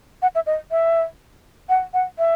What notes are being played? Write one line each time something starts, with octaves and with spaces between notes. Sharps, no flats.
F#5
E5
D#5
E5
F#5
F#5
E5